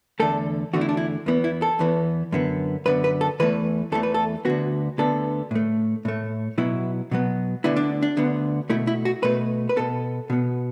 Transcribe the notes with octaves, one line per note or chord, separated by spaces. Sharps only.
E2 D3 A3 A4
E2 D3 A3 F#4
E4
D4
E4
E2 E3 B3
E4
A4
E2 E3 B3
F#2 D3 B3
F#2 D3 B3 B4
B4
A4
E2 E3 A3 B4
E2 E3 A3 A4
B4
A4
D2 D3 B3 F#4
D2 D3 B3 A4
A2 A3
A2 A3
B2 F#3 B3 E4
B2 F#3 B3
D2 D3 B3 E4
D4
D4
D2 D3 B3
B2 A3 E4
E4
F#4
B2 A3 B4
B4
B2 B3 A4
B2 B3